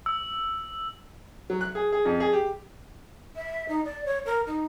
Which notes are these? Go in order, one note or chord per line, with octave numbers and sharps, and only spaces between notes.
E6
F#3
F#6
G#4
G#4
F2
G#4
G4
E5
D#4
D5
C#5
A#4
D#4